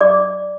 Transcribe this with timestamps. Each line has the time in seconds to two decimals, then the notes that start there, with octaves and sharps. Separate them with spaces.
0.01 D4 D5 D6